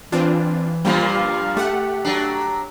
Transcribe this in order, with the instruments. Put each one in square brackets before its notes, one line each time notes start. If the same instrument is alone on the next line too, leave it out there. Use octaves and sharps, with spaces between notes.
[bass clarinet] E3 [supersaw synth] C4 D4 F4
[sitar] G2 A#2 F3 [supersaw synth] G3 A#3 F4
[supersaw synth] A3 F#5 [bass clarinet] G4
[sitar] F#3 D4